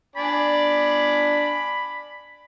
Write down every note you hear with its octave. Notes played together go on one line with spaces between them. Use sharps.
D4 D5 G#5 B5